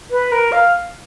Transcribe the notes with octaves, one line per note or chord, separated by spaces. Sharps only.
B4
A#4
F5